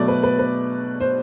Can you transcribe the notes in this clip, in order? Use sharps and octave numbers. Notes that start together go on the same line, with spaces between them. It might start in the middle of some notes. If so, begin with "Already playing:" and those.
Already playing: B2 F#3 A3 D5
B4
B4
B4
C5